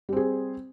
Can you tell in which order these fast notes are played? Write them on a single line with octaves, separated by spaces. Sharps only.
G3 C4 G#4